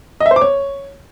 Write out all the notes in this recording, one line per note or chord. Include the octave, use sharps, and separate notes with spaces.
D#5
E5
C5
D6
C#5